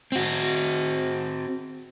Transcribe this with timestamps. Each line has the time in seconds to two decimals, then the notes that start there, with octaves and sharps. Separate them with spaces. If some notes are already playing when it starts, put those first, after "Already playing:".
0.12 C4 F#4